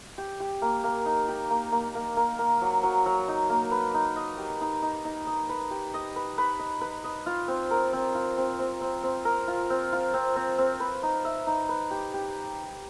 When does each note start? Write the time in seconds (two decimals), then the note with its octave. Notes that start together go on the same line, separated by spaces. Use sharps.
0.18 G4
0.40 G4
0.62 A#3
0.84 A#3
1.06 D#4
1.29 G4
1.50 A#3
1.72 A#3
1.95 A#3
2.17 A#3
2.39 A#3
2.61 F#3
2.83 F#3
3.06 F#3
3.28 D#4
3.50 A#3
3.71 B4
3.94 D#4
4.16 D#5
4.38 G4
4.61 D#4
4.82 D#4
5.05 D#4
5.27 D#5
5.49 B4
5.71 G4
5.94 D#5
6.16 B4
6.38 B4
6.59 D#5
6.81 B4
7.04 D#5
7.26 F4
7.48 C4
7.71 A#4
7.93 C4
8.15 F4
8.37 C4
8.59 C4
8.81 C4
9.03 C4
9.25 A#4
9.48 F4
9.70 C4
9.93 F4
10.14 C4
10.36 C4
10.58 C4
10.80 B4
11.03 D#4
11.25 E5
11.47 D#4
11.69 B4
11.91 G4
12.14 G4